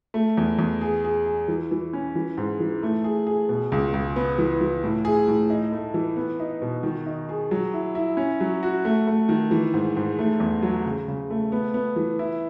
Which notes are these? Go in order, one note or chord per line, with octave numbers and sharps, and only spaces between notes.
A3
E2
E2
G#4
G#4
G#4
E3
E3
C#4
E3
G#2
E3
A3
G#4
G#4
B2
C#2
C#2
B3
E3
E3
A2
G#4
A2
D#4
A3
E3
B3
D#4
B2
D#3
D#4
G#4
F#3
E4
E4
C#4
F#3
F#4
A3
A3
D#3
E3
G#2
G#2
A3
E2
F#3
C#3
C#3
A3
B3
B3
E3
E4